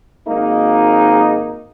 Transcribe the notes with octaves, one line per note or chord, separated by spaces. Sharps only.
G#1 G#2 A#3 D#4